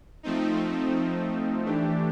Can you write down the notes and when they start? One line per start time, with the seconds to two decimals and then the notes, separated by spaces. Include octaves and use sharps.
0.23 F3 A3 C4 D#4
1.65 E3 A3 D4 G4